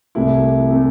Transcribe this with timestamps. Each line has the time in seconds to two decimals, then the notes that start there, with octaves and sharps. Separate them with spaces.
0.15 C2 C3 A3 E4
0.71 C3 A3